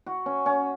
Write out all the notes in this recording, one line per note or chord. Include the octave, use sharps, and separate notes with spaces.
F#4
C#4
C#4